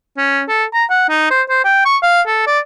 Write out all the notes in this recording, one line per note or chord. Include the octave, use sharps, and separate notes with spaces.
C#4
A4
A#5
F#5
D#4
C5
C5
G5
C#6
F5
A4
D5